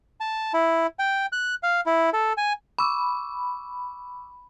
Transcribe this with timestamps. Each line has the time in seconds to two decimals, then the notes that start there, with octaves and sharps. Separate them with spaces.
0.20 A5
0.54 E4
0.99 G5
1.32 F#6
1.63 F5
1.86 E4
2.13 A4
2.37 G#5
2.79 B5 C#6 D6 E6